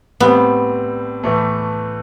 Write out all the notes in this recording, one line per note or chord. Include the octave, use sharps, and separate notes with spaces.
A2 G3 B3 C4
A2 E3 A3